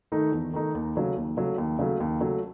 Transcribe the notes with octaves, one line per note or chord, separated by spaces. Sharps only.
D#3 A3 D#4
E2
D#3 A3 D#4
D#2
C#3 F#3 A3
D#2
C#3 F#3 A3
D#2
C#3 F#3 A3
D#2
C#3 F#3 A3